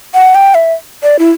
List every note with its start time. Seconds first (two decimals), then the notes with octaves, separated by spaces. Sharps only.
0.14 F#5
0.35 G5
0.55 E5
1.03 D5
1.19 E4